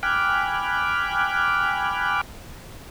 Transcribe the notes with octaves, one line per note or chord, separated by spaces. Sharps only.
G5 G#5 B5 D6 F6 F#6